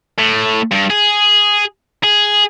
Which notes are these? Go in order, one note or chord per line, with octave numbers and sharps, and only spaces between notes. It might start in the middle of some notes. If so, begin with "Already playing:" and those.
A2
G2
G#4
G#4